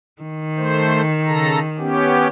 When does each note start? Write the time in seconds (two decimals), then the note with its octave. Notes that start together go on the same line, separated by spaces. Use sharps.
0.22 D#3
0.57 A3 C5
1.26 C#3 A4 A#5
1.79 B3 C#4 G4